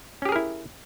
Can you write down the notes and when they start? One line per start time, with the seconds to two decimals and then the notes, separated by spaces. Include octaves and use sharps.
0.22 C#4
0.25 G4
0.29 G#4
0.32 A#4
0.36 E4